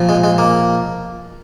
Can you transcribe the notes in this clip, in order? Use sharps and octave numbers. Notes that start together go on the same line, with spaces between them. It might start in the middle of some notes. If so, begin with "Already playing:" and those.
Already playing: A#2 F3
G#3
G#3
A#3